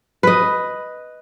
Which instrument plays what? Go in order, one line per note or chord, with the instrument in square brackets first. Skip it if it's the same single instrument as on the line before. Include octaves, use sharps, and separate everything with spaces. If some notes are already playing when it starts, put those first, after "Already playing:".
[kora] B4 D#5